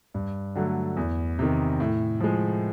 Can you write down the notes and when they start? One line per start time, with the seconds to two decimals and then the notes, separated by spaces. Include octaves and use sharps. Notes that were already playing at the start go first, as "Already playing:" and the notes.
0.14 G2
0.55 D3 F#3 A3
0.97 E2
1.39 C3 D#3
1.80 A2
2.20 F3 G#3